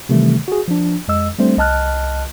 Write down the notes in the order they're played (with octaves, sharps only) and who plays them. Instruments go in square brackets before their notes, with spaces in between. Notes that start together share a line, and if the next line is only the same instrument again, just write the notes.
[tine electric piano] C3 D#3 E3 G3 A3
F#4 G#4
F3 D4
F2 G#3 D#5 E6
G3 A3 C4 D4 C5
C2 D#5 A5 F6 F#6